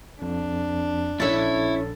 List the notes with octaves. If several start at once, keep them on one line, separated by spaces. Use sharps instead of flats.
F2 D4
A#1 C#4 E4 A4 C#5 E5 A6